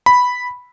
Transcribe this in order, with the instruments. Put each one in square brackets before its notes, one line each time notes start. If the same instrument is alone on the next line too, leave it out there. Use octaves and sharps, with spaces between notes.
[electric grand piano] B5